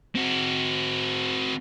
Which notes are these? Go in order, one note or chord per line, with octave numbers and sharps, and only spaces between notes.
C4 F#4